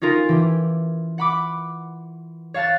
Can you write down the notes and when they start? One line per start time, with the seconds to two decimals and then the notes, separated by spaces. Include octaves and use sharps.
0.02 C#4 D#4 F4 A#4 G#5
0.29 E3 G4
1.18 F#5 B5 D6
2.54 C#5 F5 A5 F#6 A6